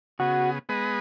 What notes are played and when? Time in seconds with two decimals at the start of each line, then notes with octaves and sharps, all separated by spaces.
0.19 C#3 B3 F#4 G#4
0.69 G#3 B3 G#4 B4 D#5